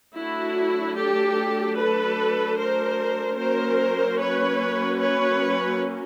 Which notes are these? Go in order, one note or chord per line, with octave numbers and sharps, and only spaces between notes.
F#3 A3 D4 E4 F#4
G4 A4
A4 B4
A#4 C5
F#3 A#3 C#4 A#4 C5
B4 C#5
B4 C#5